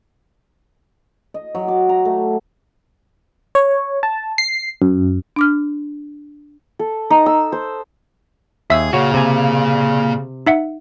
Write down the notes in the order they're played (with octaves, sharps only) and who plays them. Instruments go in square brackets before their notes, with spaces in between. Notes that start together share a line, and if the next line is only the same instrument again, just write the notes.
[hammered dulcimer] D#5
F#3
D6
A#5
A3
[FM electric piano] C#5
A5
C7
F#2
[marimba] D4 D6 F6
[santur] A4
D#4
E6
C5
[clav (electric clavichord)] D#2 [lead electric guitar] G#4 [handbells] E5 E6
[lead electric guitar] A#2 [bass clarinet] C#3 [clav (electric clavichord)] F#4 C#5
[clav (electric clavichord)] C3 G#5
[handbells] D#4 E5 F#5